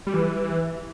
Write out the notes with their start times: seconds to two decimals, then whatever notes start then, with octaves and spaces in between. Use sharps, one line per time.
0.07 G3
0.14 E3